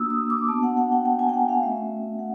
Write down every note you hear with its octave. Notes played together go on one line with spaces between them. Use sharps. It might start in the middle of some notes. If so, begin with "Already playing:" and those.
Already playing: A#3 D4 F#4 D#6 E6
D#6
D6
B3 D4 F#4 A5
F#5
F#5
G5
G5
G#5
G5
F#5
F5
A3 C#4 F#4 E5
F#5